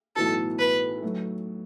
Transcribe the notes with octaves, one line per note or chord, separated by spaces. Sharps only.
B1 A2 E3 B3 F#4 A4
B4
F#3 A3